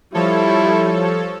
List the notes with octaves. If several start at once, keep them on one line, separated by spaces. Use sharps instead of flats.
F3 G3 E4 A4 C#5